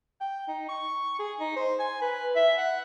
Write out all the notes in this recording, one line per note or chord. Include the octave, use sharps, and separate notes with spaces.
G5
D#4
C#6
G#4
D#4
C5
G#5
B4
E5
F#5